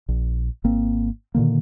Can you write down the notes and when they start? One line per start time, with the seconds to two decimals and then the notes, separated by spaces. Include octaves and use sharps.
0.08 A#1
0.64 G#1 A#3 C4
1.35 A#2 D3 D#3 A#3